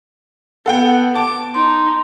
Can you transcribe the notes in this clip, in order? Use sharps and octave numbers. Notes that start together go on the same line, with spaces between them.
B3 A4 F#5 G5
A5 D6
D#4 C6